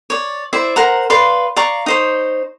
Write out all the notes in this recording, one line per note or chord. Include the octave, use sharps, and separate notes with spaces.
C#5 D5
E4 C5 D5 E5
A#4 C5 F#5 A#5
B4 D5 F5 C6
D5 F5 A#5 C#6
D#4 C5 C#5